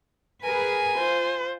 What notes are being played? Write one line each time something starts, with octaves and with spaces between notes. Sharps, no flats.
G#4 A#4 B4 G#5
F4 C5